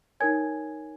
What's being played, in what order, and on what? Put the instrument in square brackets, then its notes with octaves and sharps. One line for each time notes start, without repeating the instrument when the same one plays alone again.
[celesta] D#4 A#4 C#5 G#5 G#6